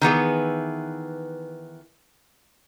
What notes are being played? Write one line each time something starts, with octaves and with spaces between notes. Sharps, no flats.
D#3 E3 B3 G#4